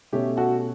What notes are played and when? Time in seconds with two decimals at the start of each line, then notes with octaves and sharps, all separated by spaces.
0.13 B2 A3 C#4 G4
0.37 F#4 A4